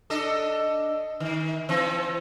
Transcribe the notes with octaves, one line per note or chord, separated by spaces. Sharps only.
D4 A4 D#5
D#3
E3 C4